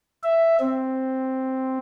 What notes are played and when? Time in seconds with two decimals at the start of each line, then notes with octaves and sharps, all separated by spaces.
0.23 E5
0.60 C4